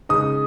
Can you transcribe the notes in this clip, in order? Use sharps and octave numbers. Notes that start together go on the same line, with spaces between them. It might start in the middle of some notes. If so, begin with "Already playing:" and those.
C#3 G#3 D#4 D#6